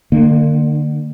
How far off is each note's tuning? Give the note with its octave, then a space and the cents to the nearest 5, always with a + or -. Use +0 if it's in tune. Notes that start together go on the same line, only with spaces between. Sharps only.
D3 +30 A#3 -30